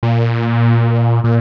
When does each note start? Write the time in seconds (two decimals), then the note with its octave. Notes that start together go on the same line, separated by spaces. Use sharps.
0.03 A#2
1.24 A#2